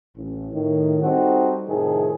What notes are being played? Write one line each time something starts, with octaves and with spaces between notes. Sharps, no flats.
A1
A2 D#3
G3 C4 D#4 F#4 G4 A4
F2 A2 C3 D#3 G#4 A4